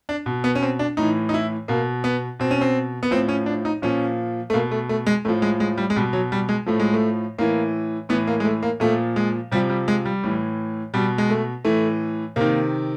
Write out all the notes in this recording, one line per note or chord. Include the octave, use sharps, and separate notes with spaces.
D4
B2
B3
C#4
C4
D4
A2 E3 D#4
D#4
E4
B2 A#3
B3
B2 C4
C#4
C4
B3
A2 F3 C4
C#4
D4
D#4
A#2 F3 C#4
A3
B2 A#3
A3
A3
G#3
A2 F3 A3
G#3
G#3
G3
G#3
B2 G3
F#3
G3
G#3
A2 F3 A3
G#3
A3
A2 E3 A#3
A2 E3 B3
A#3
G#3
A3
A#3
A#2 F3 A3
G#3
C3 F3 G3
G3
G#3
G3
A2 E3
B2 G3
G#3
A3
A2 E3 A3
C3 D#3 A#3